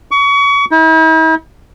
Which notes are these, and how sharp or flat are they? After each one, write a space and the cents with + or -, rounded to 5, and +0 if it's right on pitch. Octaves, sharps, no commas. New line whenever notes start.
C#6 +30
E4 -45